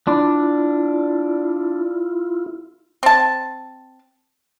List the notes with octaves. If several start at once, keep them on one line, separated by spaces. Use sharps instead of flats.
D4 E4 F4
C4 A5